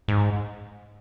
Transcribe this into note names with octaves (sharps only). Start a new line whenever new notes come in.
G#2